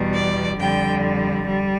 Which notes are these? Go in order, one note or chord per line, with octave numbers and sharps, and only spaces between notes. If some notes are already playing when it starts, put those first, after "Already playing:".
Already playing: E2 B2 G3
D5
F2 D3 G3 G5
G3